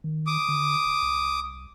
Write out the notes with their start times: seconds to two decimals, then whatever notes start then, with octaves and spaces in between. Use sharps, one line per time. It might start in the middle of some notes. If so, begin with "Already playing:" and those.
0.04 D#3
0.27 D6 D#6
0.48 D3
0.85 E1
1.02 C2